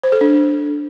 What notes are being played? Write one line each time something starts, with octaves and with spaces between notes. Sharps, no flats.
C5
A4
D4